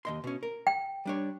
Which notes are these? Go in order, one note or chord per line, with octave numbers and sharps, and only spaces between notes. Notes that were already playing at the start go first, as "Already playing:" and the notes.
D#2 D#5 C6
B2 C#4
A#4
G5
G3 D4 C#5